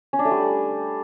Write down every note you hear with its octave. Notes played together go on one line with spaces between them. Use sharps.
C#4
D4
A3
G3